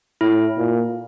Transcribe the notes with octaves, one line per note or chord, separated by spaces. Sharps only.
A2 E4
A#2